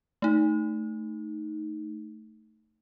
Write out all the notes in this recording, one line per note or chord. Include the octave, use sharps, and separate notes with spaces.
A3 D#4